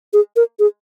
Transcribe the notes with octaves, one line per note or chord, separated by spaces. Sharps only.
G#4
A#4
G#4